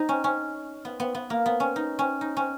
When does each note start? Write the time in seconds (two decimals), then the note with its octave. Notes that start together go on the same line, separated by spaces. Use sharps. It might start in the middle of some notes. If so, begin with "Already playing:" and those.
Already playing: D#4
0.09 C#4
0.24 C#4
0.85 B3
1.00 B3
1.15 B3
1.30 A#3
1.46 B3
1.60 C#4
1.76 D#4
1.99 C#4
2.21 D#4
2.37 C#4